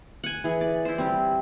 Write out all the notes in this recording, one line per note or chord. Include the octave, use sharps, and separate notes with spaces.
F#5 G#5
E3 G#4
D5
E4 C5
G3 C4